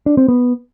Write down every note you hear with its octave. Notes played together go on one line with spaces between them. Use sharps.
D4
C4
B3